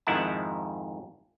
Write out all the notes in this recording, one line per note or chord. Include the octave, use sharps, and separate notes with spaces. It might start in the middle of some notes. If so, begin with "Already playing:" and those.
F2 G#2 D#3 E4 F#5 A5